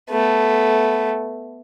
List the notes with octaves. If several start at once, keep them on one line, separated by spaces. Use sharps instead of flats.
A3 B3